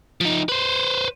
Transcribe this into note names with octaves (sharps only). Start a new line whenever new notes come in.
F3 D#4
B4 C5